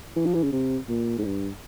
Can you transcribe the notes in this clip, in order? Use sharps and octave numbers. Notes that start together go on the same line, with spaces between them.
E3
F3
E3
C#3
C3
A#2
G#2
G2